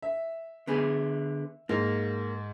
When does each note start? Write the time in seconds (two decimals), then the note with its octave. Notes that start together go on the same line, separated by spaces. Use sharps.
0.02 E5
0.67 D3 B3 G#4
1.69 G#2 A#3